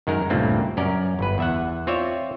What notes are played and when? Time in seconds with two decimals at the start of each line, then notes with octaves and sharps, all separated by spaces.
0.07 F#2 D#3 G#3 A#4
0.30 C#2 G2 A#2 A3 A#3 C4
0.77 F#2 C#4 A#4 D5
1.19 G1 B4
1.38 E2 E5 F#5
1.87 C4 F4 C#5 D5 E5